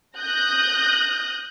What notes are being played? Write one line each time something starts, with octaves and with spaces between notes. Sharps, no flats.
D#6 F#6 G6 A#6